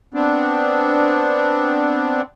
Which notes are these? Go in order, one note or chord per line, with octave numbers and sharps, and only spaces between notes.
B3 C4 D4